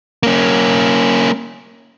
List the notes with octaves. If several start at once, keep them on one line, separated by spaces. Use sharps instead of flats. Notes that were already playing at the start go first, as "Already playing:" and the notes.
A#3 C#4